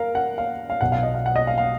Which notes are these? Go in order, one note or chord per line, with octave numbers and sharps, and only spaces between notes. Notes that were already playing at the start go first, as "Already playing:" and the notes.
Already playing: A#4 F5
F#5
F5
F5
B1 B2 F#3 F#5
F5
D#5
F5
F#5
D#5
F5
F5